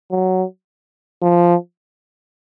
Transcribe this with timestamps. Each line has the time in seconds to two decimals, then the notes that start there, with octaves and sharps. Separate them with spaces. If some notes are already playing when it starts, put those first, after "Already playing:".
0.11 F#3
1.22 F3